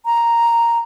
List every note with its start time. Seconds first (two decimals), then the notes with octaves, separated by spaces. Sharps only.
0.05 A#5